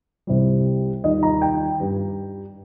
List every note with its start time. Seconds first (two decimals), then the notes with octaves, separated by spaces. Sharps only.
0.27 C2 C3 G3
1.04 D#2 D#3 G3 D#5
1.23 A#5
1.42 G5
1.80 G2 G3